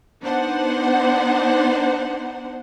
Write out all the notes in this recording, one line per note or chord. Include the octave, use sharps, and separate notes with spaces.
B3 D4 D#4 C5 F#5